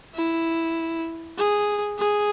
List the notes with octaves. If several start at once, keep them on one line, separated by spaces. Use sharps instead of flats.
E4
G#4
G#4